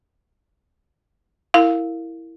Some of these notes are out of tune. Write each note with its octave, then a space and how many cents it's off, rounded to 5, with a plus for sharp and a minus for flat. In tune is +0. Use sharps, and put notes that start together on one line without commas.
E4 +0 A#4 -25 F5 +0